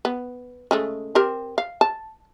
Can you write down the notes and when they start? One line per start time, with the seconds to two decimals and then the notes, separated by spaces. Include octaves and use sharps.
0.05 B3
0.71 C#3 G#3 A3
1.15 C4 G4 A#4
1.58 F5
1.81 A5